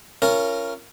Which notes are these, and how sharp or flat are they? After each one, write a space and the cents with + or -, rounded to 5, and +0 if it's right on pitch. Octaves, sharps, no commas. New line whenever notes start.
C#4 +5 F4 -35 A#4 -5